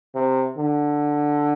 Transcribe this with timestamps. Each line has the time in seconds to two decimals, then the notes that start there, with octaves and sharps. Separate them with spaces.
0.15 C3
0.57 D3